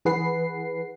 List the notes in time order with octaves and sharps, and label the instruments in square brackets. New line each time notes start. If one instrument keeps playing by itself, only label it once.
[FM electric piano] E3 G#4 B4 F#5 C7